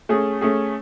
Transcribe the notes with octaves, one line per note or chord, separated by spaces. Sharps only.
A3 C#4 G#4
A3 C#4 G#4